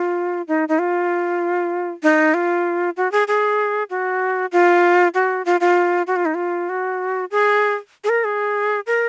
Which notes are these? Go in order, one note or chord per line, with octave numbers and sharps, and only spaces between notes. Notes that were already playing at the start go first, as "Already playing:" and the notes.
Already playing: F4
D#4
D#4
F4
D#4
F4
F#4
G#4
G#4
F#4
F4
F#4
F4
F4
F#4
F4
D#4
F4
F#4
G#4
G#4
A#4
G#4
A#4